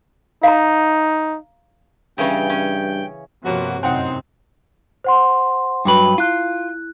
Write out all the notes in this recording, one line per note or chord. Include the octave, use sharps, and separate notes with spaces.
D#4 F5 A#5
G2 C#3 E3 C#4 G5 G6
C#4
G2 C3 F3 A#3 B3 F#4 C#5
A1 F#2 C3 C4 D#4 F#5 G5
C5 F#5 C6
G2 F#3 B4
E4 F4 F#6